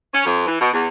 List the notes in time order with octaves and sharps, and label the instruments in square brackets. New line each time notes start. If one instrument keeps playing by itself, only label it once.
[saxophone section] C#4
F2
E3
B2
E2